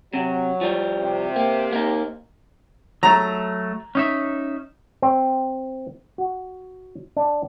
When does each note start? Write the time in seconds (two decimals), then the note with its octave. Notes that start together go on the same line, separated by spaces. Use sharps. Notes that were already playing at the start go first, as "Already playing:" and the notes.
0.14 C3 F#3
0.61 F3 G3
0.99 C3 C4
1.36 A#3
1.73 A#3 D#4
3.03 F#3 A3 A#5
3.95 C#4 D#4 E5
5.02 C4
6.18 F#4
7.17 D4